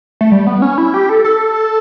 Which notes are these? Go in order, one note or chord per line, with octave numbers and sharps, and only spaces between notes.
A3
G3
B3
C#4
E4
G4
A4
A4